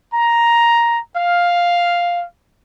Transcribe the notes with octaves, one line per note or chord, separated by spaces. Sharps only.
A#5
F5